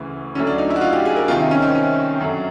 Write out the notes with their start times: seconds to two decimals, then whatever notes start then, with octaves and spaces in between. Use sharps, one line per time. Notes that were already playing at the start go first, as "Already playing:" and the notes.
Already playing: D2 C#3 E3
0.35 D2 D3 F#3 C#4
0.47 D4
0.58 D#4
0.70 E4
0.76 F#4
0.81 F4
0.93 G4
1.05 G#4
1.16 A#4
1.28 C2 C3 D#3 F4
1.40 D#4
1.51 C#4
1.62 C4
1.75 C#4
2.20 F#2 D3 F#3